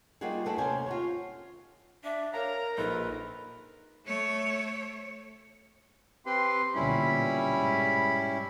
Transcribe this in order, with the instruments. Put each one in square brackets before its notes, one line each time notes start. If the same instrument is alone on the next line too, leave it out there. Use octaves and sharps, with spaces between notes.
[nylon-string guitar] G3 A#3 D#4 F4 F#4 G#4
A3 F#4 G#4 A4 B4 D5
D#2 C3 C#4 C5 G#5
F4 F#4 C#5
[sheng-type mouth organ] D4 [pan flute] E5
[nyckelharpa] A#4 [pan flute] C#5 [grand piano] F5 [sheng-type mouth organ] A#5
[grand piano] A#1 D#4 [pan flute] A4 [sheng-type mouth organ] B4
[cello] A3 C#5
[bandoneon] C4 G4 B4 [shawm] C6
[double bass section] B1 A#2 D3 [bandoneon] G3 C#4 E4 [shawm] B5
[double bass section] G#2